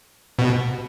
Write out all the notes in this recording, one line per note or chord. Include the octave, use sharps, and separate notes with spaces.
B2